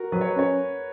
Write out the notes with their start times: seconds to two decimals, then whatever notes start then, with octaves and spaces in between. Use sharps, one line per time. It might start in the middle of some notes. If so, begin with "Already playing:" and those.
Already playing: F#4 A#4
0.12 F#3 B4
0.21 C#5
0.30 B4
0.36 C#4 C#5